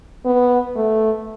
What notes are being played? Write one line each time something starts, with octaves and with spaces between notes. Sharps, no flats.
B3
A3